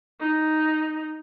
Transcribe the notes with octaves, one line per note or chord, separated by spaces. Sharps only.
D#4